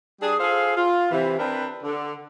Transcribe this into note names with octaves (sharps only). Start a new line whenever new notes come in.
G3 D4 G#4
F4 G#4 A4 C5 F5
F4
C3 E3
C4 D4 A#4 B4
D3